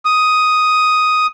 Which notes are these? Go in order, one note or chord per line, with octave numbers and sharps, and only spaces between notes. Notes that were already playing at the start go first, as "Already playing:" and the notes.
D#6